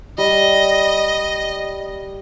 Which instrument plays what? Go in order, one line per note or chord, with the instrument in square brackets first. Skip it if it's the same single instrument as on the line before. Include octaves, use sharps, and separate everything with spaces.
[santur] G3 [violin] D#5